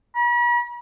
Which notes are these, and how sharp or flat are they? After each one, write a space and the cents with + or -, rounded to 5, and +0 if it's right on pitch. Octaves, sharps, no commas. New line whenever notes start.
B5 -45